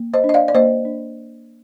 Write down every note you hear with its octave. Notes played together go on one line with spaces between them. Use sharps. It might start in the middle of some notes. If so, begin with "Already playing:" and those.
Already playing: A#3
C5 D#5
D4
D#5
D5 F5
D5
A#3 C5 D#5
D4